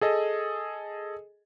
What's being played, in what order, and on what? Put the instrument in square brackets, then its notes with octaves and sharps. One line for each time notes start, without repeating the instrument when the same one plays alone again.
[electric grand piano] G#4 A4 D#5